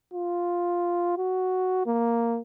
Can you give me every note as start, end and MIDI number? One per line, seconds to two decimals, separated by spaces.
0.14 1.17 65
1.17 1.86 66
1.86 2.39 58